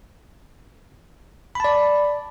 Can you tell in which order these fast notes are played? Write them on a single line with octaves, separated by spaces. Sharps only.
B5 A5 D5